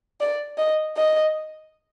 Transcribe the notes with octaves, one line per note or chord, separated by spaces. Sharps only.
D5
D#5
D#5